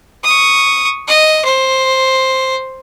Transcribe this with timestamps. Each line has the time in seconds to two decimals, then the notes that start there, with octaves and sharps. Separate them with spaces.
0.24 C#6 D#6
1.08 D#5
1.45 C5